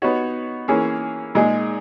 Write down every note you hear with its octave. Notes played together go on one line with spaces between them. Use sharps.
B3 D#4 F#4 C#5
E3 A#3 C#4 G#4 C#5
A#2 G#3 D#4 G#4